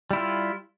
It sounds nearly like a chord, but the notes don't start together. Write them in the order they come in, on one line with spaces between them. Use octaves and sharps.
G3 E4 F4